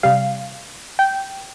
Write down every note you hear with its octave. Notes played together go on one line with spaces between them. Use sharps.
C3 G3 F5
G5